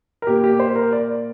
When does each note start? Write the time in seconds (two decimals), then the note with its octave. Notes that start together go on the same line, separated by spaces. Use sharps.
0.22 A#4
0.27 A#2 A#3 G4
0.44 G4
0.60 C5
0.76 A#4
0.93 D5